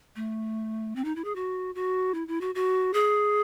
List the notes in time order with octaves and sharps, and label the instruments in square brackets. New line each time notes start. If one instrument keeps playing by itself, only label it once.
[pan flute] A3
C4
D#4
E4
G#4
F#4
F#4
E4
E4
F#4
F#4
G#4